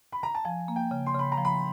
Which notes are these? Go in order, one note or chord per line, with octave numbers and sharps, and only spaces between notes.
B5
A#5
A5
F3 G#5
A#3
G5
C#3
C6
C#3 B5
A#5
F3
B5